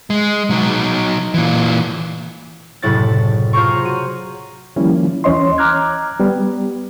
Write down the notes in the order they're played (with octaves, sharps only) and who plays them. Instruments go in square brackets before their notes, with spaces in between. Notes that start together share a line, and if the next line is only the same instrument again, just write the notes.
[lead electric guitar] G#3
F#3 D#4
A#2 E3
[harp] F#1 A2 C3 E4 C#5 A6
F4 G#4 C5 C#5 A#5 C#6
F#4 D#7
[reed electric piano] D#3 F3 G3 A#3 C#4 E4
D2 E3 C#4 C#5 D#5 C6
A#5 D6 F6 F#6 G#6
G3 B3